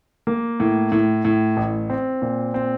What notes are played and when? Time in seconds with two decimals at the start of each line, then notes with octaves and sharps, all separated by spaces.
0.27 A#3
0.60 A2
0.92 A2
1.25 A2
1.57 A1
1.90 C4
2.22 A#2
2.54 C4